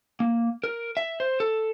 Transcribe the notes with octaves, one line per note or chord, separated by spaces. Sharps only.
A#3
A#4
E5
C5
A4